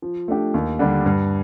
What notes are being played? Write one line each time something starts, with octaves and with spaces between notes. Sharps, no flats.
F3
A3 D4 G4
D#2
D3 G3 D4
G2